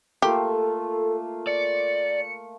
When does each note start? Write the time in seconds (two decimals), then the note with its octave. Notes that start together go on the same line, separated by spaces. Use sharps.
0.22 A3 A#3 F4 G4 A4
1.47 D5 C#7